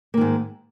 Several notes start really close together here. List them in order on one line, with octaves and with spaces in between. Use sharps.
A#3 D#3 G#2